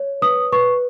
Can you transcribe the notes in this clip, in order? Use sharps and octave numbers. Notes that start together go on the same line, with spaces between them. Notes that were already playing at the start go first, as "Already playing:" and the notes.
Already playing: C#5
B4 D#6
B4 C#6